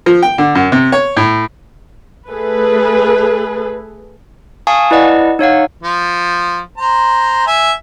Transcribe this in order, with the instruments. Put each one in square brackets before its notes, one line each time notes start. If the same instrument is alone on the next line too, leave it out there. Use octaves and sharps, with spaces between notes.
[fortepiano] F3
G5
D3
F#2
C3
C#5
A2
[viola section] A3 G#4 A4 B4
[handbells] F5 G#5 A5 C#6 D#6
E4 B4 D5 D#5 F#5 A5
D#4 C#5 F5 F#5
[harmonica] F3
C5 A#5
E5 G#5